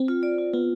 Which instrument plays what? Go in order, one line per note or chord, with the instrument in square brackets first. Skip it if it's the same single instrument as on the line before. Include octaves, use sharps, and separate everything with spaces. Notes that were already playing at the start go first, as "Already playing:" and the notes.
Already playing: [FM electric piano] C4
[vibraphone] F4
D5
F4
[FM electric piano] B3 [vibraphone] F4